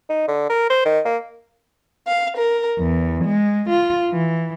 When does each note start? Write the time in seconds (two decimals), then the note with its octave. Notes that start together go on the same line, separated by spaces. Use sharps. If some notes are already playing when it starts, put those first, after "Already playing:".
0.10 D#4
0.28 D3
0.49 A#4
0.70 C5
0.85 D#3
1.05 A#3
2.07 F5
2.37 A#4
2.80 E2
3.24 G#3
3.70 F4
4.10 E3